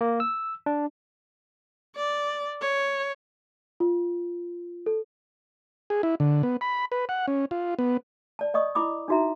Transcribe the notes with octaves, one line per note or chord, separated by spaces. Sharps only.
A#3
E6
D4
D5
C#5
F4
A4
G#4
E4
D3
B3
B5
B4
F#5
C#4
F4
B3
D5 A5
D5 D#5 C#6 D#6
E4 B5 D6 D#6
D4 D#4 F#4 E5 A#5